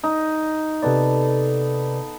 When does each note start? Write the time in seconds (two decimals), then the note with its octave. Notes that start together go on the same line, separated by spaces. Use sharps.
0.04 D#4
0.83 C3 B3 A4 B4 D5